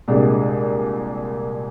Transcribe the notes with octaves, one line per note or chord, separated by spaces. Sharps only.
C2 A#2 G#3 D4 G4